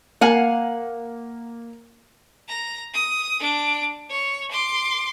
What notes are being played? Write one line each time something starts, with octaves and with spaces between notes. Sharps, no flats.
A#3 F5 F#5 G#5
A#5
D#6
D4 D7
C#5
C6 D6